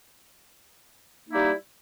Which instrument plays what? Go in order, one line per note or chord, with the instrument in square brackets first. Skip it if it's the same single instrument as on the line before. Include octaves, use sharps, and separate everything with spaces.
[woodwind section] A#3
D#4
E4
G3